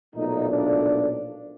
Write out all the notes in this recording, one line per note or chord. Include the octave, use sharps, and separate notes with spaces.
B1 A#2 F3 A3 D#4
D4